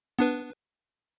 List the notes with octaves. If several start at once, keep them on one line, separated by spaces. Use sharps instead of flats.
B3 D4 B4